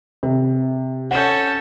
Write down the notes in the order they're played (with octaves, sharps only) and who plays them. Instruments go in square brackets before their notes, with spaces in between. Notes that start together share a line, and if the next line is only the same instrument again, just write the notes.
[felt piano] C3
[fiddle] C#4 A4 [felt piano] F#5 G6